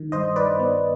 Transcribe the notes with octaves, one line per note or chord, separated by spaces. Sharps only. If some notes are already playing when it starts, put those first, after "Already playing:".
Already playing: D#3
G2 C5 D#5
G2 B4 D5
B3